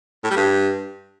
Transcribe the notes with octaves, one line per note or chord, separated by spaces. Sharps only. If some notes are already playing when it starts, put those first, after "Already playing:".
A2
G3
G2